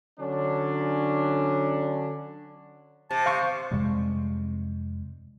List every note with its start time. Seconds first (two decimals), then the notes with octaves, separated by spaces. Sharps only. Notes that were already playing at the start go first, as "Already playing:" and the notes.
0.19 D3 F#3 C#4 D4
3.11 C3 A5
3.26 C5 F5 C#6
3.71 F2 C3 G3 G#3